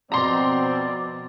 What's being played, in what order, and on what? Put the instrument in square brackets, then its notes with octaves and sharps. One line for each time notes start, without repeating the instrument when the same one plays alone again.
[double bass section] F2 B2 [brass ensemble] C4 [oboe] D5 [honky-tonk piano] A#5 C6